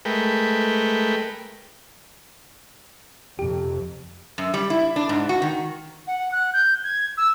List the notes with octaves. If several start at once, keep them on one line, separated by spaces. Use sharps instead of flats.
G#3 A3 A#4 B4 G5
F2 C3 G4
F#2
G3
E4
D4
G#2
F#4
D#3
F#5
F#6
G6
G#6
E6